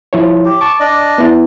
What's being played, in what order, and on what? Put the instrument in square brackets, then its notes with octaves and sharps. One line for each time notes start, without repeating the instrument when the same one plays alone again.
[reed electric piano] F3 E4 C#5
[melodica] G4
[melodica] A5 C#6 [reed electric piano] D6
[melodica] D4 D5 D#5
[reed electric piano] B3 E4